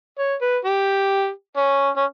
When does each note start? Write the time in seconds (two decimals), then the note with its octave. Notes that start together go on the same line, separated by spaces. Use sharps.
0.18 C#5
0.41 B4
0.65 G4
1.57 C#4
1.96 C#4